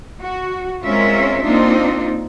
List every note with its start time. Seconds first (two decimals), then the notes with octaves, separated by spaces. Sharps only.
0.21 F#4
0.83 G#3 C4 C#4 F4 A#4 E5
1.43 A#3 C4 D4 D#4 F4